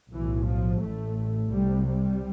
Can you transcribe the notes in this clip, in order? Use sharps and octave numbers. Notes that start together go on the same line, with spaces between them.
B1 A2 E3
F3
A1 A2 A3
C2 C3 G3
G3